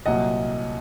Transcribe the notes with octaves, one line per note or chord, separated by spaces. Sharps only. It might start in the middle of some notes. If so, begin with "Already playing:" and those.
C2 A#2 F#3 D#5 F#5